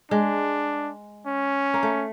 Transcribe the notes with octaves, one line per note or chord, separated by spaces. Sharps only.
G#3 D4
C#4
A#3
A3